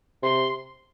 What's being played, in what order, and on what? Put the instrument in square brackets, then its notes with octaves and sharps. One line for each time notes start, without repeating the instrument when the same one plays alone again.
[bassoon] C3 [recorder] C6